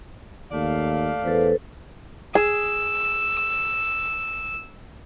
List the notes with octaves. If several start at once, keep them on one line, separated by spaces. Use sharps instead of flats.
D#2 A3 D5 F5
E2 A4 B4 C5
G#4 E6